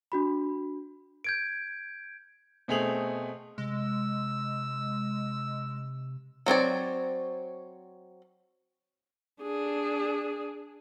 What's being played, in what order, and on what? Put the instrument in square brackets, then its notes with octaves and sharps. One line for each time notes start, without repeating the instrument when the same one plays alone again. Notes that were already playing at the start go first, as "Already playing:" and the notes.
[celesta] D4 F#4 B5
[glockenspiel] G6 G#6 D7
[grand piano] B2 A3 C4 G#4 F7 F#7
[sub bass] C3 [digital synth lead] G#3 [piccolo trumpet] E6
[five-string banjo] F#3 C4 C#5 D5
[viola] D4 G#4